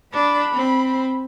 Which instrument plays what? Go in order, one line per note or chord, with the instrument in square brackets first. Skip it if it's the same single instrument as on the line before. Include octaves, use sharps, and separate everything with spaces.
[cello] D4 [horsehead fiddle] B5
[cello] C4